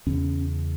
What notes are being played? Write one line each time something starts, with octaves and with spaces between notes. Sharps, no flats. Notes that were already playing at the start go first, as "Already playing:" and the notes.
E2 C#3 C#4